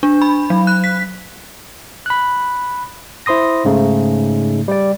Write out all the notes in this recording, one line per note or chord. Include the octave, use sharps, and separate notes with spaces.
D4
B5
F#3
F#6
B6
B5 F#6
E4 C5 C6 D#6 A#6
G#2 C#3 A3 D#4
G3 D5